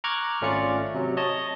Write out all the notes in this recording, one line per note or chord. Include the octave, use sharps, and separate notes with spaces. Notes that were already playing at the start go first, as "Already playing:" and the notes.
A#5 C#6 D6 F6 F#6 G#6
G#1 A3 C#4 F4 D5 C#7
C3 F#3
C#5 D#5 A5